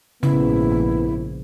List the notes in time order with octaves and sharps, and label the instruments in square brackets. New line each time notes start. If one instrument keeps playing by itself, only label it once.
[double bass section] A#1 G#2 F3 [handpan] C#3 [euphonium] B3 [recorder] E4